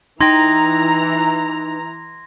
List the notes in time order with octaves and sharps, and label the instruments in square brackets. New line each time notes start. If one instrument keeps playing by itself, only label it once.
[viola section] E3 A#5 [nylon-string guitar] D#4 G5 [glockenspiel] C6 G#6 A#6